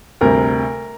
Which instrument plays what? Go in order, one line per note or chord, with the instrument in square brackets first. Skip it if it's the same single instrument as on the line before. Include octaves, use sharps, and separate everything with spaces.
[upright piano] D2 C3 G3 A#4